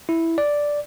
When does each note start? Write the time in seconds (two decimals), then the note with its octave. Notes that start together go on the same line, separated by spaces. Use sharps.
0.09 E4
0.38 D5